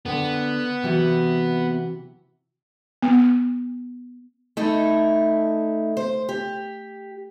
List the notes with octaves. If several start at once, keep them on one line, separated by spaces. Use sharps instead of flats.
D3 B3 G5
C3 E3 F#4
B3
A3 D#4 E4
C5
G4